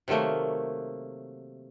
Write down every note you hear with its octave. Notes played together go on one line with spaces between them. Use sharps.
C3 D#3 F#3 A3 A#3